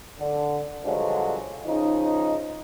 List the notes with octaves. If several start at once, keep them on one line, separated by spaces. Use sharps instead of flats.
D3
G2 D3 F3 F#3 G#3
C#3 F3 D#4